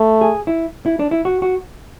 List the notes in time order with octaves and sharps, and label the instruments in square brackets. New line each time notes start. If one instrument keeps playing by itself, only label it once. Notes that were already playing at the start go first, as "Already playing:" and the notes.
Already playing: [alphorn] A3
[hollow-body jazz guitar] G#4
E4
E4
D4
E4
F#4
F#4